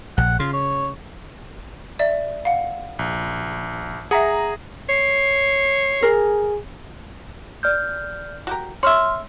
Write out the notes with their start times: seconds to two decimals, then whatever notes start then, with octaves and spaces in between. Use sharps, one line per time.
0.18 A#1 F#5
0.40 C#3 F4
0.53 C#5
1.99 D5 E5
2.45 F5 F#5
2.99 A#1
4.11 G#4 E5 F#5 A#5
4.89 C#5 C7
6.02 G#4 A#4
7.63 D5 F6 G6
8.47 F#4 G4 A#4
8.83 C#5 E5 C6 F6